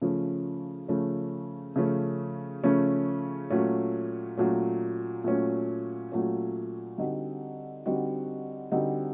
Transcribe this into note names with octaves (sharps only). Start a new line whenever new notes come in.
C#3 F3 A3 C#4
C#3 F3 A3 C#4
C#3 F3 A3 C#4
C#3 F3 A3 C#4
A#2 F#3 A3 C#4
A#2 F#3 A3 C#4
A#2 F#3 A3 C#4
A#2 F#3 A3 C#4
D3 G3 C4 D#4 F#4
D3 G3 C4 D#4 F#4
D3 G3 C4 D#4 F#4